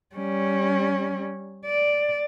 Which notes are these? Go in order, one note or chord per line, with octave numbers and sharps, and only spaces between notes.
G3 C#4
D5